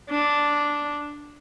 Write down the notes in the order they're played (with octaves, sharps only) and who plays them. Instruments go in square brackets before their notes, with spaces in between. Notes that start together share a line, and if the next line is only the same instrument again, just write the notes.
[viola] D4